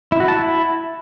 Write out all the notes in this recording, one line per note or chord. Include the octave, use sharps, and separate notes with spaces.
E4
F#4
A5
E4